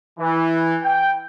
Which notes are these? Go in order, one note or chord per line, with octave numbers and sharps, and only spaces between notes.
E3
G5